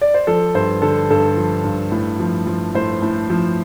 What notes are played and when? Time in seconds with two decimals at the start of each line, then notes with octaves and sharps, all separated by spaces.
0.01 D5
0.14 C5
0.27 F3 A4
0.55 G2 C5
0.82 D3 A4
1.10 G2 A4
1.37 F3
1.64 G2
1.92 A2
2.20 F3
2.47 F3
2.75 A2 C5
3.02 A2
3.30 F3